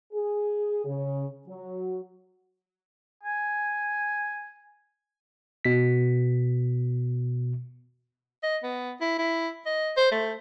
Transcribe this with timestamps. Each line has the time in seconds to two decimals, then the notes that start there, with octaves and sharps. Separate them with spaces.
0.13 G#4
0.85 C#3
1.48 F#3
3.23 G#5
5.65 B2 B6
8.43 D#5
8.63 B3
9.01 E4
9.18 E4
9.66 D#5
9.97 C5
10.11 A3